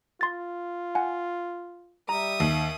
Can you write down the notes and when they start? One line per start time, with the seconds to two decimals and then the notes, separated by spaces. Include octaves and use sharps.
0.21 F4 C6 A6
0.95 F#5 G#5
2.09 G3 E5 A#5 D#6
2.40 D#2